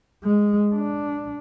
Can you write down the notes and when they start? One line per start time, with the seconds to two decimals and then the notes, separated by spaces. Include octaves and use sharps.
0.24 G#3
0.74 D4